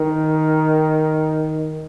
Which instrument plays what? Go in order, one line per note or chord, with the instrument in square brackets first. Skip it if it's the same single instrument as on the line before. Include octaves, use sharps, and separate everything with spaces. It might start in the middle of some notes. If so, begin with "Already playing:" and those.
Already playing: [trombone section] D#3